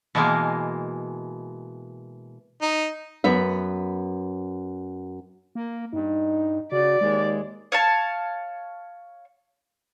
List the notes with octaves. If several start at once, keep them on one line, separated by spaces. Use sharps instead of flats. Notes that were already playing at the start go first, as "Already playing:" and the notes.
B2 E3 G#3 A#3
D#4
F#2 B3 E5
A#3
G2 D#4
C#3 F#4 D5
D#2 G#3
C#5 F5 A5